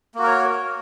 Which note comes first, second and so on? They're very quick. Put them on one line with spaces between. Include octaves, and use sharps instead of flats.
A#3 F#4 A#4 C#5